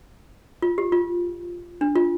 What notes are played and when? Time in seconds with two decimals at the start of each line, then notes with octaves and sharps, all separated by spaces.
0.62 F4
0.78 G4
0.92 F4
1.81 D4
1.96 F4